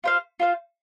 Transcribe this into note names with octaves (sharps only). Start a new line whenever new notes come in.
F4 C5 F5
F4 C5 F5